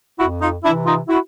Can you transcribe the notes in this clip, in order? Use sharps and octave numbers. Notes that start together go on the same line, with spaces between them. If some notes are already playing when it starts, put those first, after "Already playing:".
F2 E4 F#4
D#4 F4
C3 E3 D4 E4
D#4 F4
E4 F#4